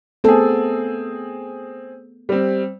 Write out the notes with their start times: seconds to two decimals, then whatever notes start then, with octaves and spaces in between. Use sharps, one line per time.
0.24 A3 B3 C4 G#4 A4
2.29 G3 C4